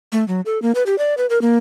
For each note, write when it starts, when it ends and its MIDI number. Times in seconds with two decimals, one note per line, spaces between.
0.12 0.26 57
0.28 0.41 54
0.46 0.61 69
0.62 0.72 58
0.75 0.83 71
0.86 0.98 67
0.98 1.14 74
1.17 1.26 71
1.30 1.41 70
1.42 1.58 58